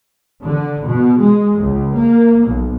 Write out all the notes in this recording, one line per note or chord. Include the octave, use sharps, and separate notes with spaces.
D3
B2
G#3
C#2
A#3
B1